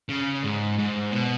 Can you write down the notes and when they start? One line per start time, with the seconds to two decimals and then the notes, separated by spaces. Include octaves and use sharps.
0.09 C#3
0.43 G#2
0.78 G#2
1.13 B2